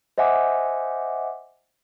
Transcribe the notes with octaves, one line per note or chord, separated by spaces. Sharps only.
C5 D#5 E5 F#5 G#5 D6